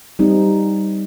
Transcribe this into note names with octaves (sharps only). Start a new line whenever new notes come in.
G3 C4 D#4